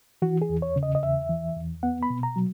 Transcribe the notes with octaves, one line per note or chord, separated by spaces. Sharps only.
E3 F#4
G#4
E2
C#5
C#3
D#5
D#5
E2 E5
E3
E2
B3 F#5
B5
B2
A#5
F#3